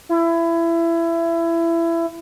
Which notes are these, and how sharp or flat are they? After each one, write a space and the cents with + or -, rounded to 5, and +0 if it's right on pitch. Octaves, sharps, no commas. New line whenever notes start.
E4 +25